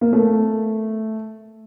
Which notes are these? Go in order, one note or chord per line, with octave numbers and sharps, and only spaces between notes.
A#3
A3